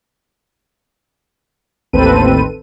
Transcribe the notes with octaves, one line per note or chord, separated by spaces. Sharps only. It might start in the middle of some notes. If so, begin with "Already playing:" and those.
A1 D#2 C4 A4 B4 D#7